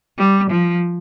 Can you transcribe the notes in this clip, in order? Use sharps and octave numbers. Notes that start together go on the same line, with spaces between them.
G3
F3